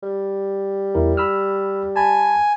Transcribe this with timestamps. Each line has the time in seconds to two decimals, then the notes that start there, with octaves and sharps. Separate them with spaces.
0.03 G3
0.95 E2 E4 A#4
1.17 B5 E6 F6
1.96 G#5 A5 B5